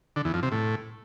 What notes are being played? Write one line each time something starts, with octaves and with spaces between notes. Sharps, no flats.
D3
E2
F2
C3
A2